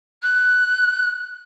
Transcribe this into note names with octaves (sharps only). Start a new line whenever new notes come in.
F#6